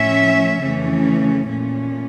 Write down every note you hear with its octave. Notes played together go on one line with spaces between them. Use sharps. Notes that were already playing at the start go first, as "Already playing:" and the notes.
Already playing: A2 F3 C#4 E5
F2 C#3 E3 A3 C#4
A#2 A3 C#4